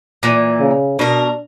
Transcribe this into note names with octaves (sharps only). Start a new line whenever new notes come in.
A#2 E3
C#3
B2 D4 A#4